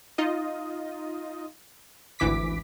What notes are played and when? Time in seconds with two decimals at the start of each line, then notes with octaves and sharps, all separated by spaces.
0.18 D#4 F4 D#5
2.19 G#1 D2 E3 D6 B6